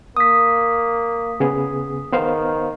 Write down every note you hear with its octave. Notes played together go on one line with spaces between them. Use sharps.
A#3 D#6 B6
C#3 B3 G#4
D#3 B3 C5 F5